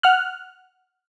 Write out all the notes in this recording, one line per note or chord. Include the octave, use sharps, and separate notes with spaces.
F#5 F6 F#6